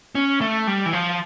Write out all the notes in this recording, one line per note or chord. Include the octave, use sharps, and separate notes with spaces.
C#4
A3
G3
E3
F3